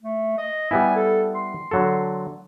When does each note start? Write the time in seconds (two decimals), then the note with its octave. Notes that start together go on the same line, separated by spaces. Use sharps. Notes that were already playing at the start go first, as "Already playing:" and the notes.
0.03 A3
0.38 D#5
0.71 G3 B3 E4 G#5
0.96 A4
1.35 C6
1.71 D3 F#3 A4